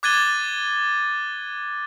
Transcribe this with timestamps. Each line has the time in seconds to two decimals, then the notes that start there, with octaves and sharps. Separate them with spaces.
0.03 D6 F#6 G#6 A6 D#7 G7